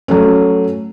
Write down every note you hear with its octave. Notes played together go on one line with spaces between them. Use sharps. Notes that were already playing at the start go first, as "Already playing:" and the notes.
F#3 A3 C#4